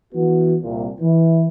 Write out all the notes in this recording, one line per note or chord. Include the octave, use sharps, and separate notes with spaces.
E3 B3 F#4
C2 A#2
E3